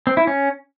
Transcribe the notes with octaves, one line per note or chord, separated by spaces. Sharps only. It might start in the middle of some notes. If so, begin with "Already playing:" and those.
C4
E4
C#4